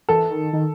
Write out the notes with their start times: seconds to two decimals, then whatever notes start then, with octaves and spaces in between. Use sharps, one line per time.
0.09 E3 A4
0.30 D#3
0.53 D#3